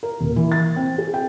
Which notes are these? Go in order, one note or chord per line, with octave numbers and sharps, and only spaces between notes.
A#4
D#1
E3
A6
C4
G#4
G5